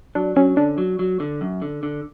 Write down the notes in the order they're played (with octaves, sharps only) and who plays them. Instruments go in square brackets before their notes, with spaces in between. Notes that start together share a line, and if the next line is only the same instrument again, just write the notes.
[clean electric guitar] F#3 [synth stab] D4
[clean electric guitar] F#3 [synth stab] C#4
[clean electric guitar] D3 [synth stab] D4
[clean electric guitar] F#3
F#3
D3
F#2
D3
D3